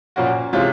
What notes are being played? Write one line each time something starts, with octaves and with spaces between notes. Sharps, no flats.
A#2 F3 A#3 C#4 F#4
C3 E3 G#3 C#4 F4